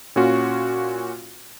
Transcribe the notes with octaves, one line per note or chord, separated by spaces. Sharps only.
A#2 C#4 F4 F#4